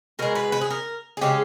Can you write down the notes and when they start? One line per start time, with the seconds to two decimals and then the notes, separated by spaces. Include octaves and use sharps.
0.19 B2 G#3 A#4
0.35 B4
0.52 B4
0.61 G#4
0.70 A#4
1.17 G#4
1.21 C#3 G#3 G4